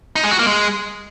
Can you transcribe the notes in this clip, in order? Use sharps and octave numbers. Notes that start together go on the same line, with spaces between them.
D#4
G#3
F#4
A#3
G#3